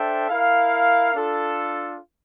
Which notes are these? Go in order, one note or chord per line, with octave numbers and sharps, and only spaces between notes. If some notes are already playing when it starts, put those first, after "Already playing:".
Already playing: D4 A4 C5 E5 G5
E4 A#4 F5
D4 F4 A4